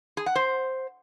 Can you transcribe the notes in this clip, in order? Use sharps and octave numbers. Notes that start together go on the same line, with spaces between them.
G#4
F#5
C5